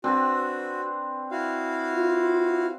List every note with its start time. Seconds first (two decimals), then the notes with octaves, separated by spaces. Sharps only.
0.04 C4 D4 F#4 B4
1.31 E4 F#4 F5
1.93 F4